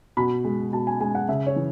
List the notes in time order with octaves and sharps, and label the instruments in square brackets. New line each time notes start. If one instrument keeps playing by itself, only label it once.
[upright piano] B2 B5
G#3
B2 A5
G#5
G#3 G#5
F#5
C#3 E5
C#5
E3